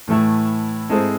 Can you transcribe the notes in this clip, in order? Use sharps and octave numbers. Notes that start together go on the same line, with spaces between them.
A2 E3 A3 E4
G#2 G#3 C4 E4 A4